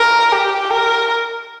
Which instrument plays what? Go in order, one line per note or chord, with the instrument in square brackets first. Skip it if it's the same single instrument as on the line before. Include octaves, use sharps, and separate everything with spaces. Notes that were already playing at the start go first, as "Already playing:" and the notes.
Already playing: [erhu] A#4
G4
A#4